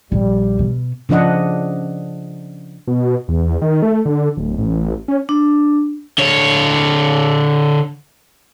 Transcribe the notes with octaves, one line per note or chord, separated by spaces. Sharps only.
A#1 G3
B2
C#3 F3 D4 D#5 F#5
B2
E2
D#3
A3
D3
D1
A1
C#4
D4
D3 C#5